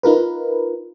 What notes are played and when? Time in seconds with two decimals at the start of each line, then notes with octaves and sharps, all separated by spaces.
0.03 D#4 F4 A#4 B4